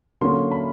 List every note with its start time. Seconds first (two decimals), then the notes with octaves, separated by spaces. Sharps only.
0.21 D3 F#3 A#3 C#4 C6
0.51 B5